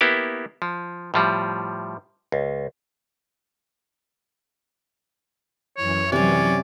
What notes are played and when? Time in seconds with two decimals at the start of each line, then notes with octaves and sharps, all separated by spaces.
0.01 A#3 B3 E4 G4
0.62 F3
1.14 A2 F3 G3
2.32 C#2
5.77 F#2 E3 C#5
6.12 C3 F#3 C#4 C#5 D5